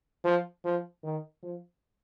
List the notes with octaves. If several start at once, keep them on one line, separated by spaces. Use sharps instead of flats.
F3
F3
D#3
F3